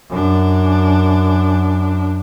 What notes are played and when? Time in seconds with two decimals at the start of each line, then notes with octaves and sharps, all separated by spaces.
0.11 F#2 D4